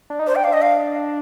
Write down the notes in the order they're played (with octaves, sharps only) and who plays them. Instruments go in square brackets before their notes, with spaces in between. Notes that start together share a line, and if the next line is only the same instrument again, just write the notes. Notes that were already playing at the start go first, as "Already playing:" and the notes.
[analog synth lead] D4
D#4
[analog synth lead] D4 [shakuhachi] C5
[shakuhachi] G5
[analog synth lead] D4 [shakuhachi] F5
[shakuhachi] D#5
F5